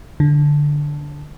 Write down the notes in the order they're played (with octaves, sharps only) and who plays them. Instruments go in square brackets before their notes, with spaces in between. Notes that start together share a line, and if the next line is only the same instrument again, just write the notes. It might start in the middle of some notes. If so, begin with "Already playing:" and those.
[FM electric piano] D3